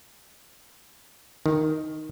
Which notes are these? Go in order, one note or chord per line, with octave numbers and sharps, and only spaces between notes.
D#3